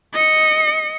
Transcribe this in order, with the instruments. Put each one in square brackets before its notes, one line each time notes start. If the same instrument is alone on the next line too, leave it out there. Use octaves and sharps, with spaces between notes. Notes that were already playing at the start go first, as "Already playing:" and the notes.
[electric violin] D#5 C#7